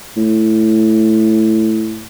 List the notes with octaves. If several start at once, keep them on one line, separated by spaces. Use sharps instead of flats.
A2